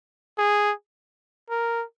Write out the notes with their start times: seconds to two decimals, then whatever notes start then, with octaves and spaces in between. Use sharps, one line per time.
0.38 G#4
1.50 A#4